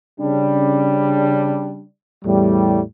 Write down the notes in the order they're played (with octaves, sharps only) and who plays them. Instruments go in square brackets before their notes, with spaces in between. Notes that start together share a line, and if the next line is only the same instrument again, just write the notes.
[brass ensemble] C#3 G3 D4
[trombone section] E2 A2 G3